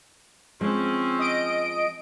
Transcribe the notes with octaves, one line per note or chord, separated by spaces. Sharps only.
F3 G#3 C4 C#4
D#5 D7